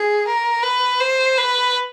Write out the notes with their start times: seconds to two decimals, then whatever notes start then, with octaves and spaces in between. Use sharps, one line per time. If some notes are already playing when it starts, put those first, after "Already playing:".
Already playing: G#4
0.27 A#4
0.63 B4
1.00 C5
1.38 B4